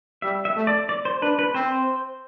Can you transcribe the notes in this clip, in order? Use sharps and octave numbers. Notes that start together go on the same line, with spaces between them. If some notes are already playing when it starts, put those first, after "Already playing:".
G3 E5
E5
A3
D5
D5
C5
D4 B4
B4
C4 C5